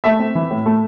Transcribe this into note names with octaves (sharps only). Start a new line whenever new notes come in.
A3 E5
C4
E3
A2
A3